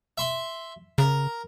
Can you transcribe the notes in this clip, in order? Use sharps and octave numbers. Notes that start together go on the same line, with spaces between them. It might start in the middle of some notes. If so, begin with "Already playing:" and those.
E5 C6
C#3 A#4